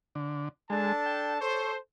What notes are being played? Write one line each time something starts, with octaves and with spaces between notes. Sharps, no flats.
D3
G#3 D4 A4 A5
G5
A4 C5 C#5